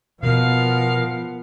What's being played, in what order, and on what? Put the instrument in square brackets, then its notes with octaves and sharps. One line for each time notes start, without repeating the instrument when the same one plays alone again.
[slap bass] B2 [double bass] F3 B3 [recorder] A#4 [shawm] F5